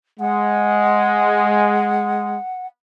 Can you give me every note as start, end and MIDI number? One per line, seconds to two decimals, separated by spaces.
0.20 2.36 56
0.20 2.67 78